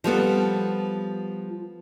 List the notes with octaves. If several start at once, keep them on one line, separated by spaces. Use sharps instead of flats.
F3 G3 B3 A4